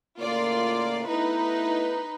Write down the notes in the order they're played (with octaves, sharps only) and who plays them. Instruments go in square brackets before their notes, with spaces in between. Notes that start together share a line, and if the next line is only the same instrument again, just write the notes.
[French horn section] A2 C#3 A#3 [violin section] F4 D5
[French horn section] A3 B3 E4 [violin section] D#4 B4